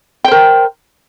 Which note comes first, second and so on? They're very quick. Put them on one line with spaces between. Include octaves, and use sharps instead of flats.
G5 C5 A#4